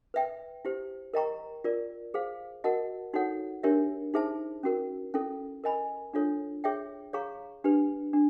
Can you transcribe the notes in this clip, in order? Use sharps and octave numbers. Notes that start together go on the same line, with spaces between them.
B4 E5 G5
E4 G4 C5
A#4 D#5 G5 A#5 C#6
F4 A#4 D5
G#4 C5 F5
F#4 A#4 D#5 F#5 A5
D#4 F#4 A4 C#5 F#5
D4 G4 A#4 C#5 E5
D#4 G#4 C5 E5 A5
C#4 F#4 A#4
C#4 E4 A4
A#4 D#5 G#5 B5
D4 F4 A4 C#5
G#4 C#5 E5 G5
G#4 C#5 F5 A#5 C#6
D4 G4 B4
D4